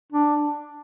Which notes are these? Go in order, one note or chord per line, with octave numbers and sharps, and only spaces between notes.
D4